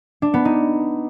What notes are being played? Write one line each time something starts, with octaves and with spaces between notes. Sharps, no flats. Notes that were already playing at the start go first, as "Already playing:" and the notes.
D4
B3
D#4